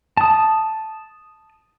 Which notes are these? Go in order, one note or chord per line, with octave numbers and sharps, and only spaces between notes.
A5 D#6